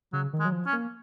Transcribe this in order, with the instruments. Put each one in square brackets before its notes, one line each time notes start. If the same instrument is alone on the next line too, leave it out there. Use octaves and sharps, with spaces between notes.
[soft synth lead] C#3 [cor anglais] F#3
[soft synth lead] D#3
[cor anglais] G#3
[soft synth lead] F#3
F3
[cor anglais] C#4
[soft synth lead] A#3